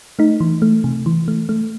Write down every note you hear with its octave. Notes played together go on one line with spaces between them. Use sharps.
A3 D#4
E3
A3
C3
E3
A3
A3